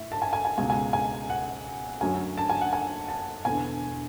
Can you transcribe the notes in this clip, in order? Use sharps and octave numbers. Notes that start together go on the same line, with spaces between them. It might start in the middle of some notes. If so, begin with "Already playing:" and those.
Already playing: A2 E5
A5
G#5
G#5
G#5
C#2 B2 G#3 G#5
G#5
G#5
F#5
F#2 D3 F#3 A3 G#5
A5
G#5
F#5
G#5
A5
E1 E2 D3 G#5